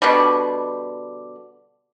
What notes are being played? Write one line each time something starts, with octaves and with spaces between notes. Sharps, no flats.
B2 D3 G3